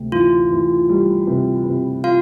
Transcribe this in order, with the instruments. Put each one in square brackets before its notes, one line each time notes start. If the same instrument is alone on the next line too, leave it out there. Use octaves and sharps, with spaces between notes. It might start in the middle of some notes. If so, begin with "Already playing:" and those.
Already playing: [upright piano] D2 C3
[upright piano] E3 [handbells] F4
[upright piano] E3
G3
C3
C3
[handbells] F4 F5